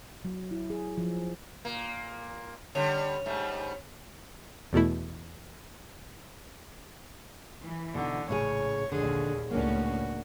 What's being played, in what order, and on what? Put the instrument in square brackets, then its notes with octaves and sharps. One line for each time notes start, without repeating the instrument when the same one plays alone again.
[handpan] F#3
E4
G#4
F3
[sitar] A#2 A#3
[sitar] D3 G3 [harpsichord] C#4
[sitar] G#2 G3 A3
[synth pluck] E2 B2 A3 E4
[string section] E3
[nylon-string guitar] B2 D#4 [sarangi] D3
[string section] A#1 [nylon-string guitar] A2 C#3 G#4 [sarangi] C#5
[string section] A#1 D#2 [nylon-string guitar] D3 [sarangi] G#4
[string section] C#2 A2 C#4 [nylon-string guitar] A#3 D4 [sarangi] F#4